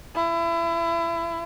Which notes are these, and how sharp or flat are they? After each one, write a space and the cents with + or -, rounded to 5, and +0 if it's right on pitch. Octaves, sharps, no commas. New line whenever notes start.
E4 +30